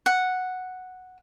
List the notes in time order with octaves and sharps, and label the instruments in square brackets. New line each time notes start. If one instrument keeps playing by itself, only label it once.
[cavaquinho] F#5